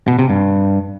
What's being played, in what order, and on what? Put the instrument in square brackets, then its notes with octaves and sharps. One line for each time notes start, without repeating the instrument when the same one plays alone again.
[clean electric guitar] B2
C3
G2